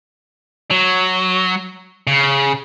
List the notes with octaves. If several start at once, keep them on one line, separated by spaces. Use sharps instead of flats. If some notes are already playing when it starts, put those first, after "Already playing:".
F#3
C#3